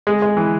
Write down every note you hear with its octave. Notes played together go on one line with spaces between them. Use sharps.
G#3
G#3
E3